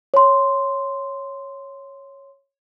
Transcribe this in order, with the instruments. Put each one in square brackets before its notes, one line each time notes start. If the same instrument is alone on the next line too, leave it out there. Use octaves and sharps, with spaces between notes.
[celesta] C#5 C6